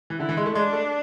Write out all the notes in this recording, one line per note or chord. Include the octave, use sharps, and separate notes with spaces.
E3
D3 E4
E3
G#3
A3
G#3 D4
A3